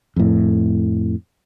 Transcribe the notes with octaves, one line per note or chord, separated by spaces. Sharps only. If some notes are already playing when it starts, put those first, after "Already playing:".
F2 A2